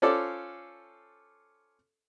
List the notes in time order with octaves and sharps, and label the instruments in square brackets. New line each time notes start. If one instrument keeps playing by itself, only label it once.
[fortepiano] C#4 F4 A4 C5 D5